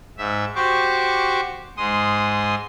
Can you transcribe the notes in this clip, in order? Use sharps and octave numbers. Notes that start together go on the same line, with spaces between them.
G#2 E5
F#4 G4 C5 C#6 D6
G#2 G#3 C6 D#6